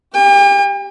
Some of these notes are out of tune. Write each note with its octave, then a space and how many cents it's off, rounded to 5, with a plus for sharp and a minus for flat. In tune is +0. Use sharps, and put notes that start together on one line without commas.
G4 +0 G5 +45